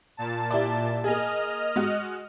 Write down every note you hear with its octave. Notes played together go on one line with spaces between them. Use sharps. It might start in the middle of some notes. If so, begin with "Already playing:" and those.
A#2 A5
E4 G4 D5
A#3 G#4 D#5 F6
G#3 F#4